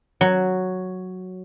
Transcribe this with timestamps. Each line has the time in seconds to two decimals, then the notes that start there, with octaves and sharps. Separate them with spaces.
0.21 F#3